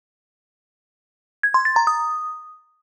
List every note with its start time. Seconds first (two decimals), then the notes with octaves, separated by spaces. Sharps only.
1.43 G#6
1.54 C6
1.65 A6
1.76 A#5
1.87 D#6